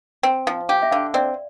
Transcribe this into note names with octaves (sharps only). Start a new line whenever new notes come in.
C4 G5
F3 F5
G4 F5
E5
D3 F5
C4 D5